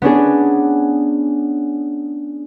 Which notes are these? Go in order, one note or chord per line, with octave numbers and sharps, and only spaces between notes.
B3 C#4 D4 G#4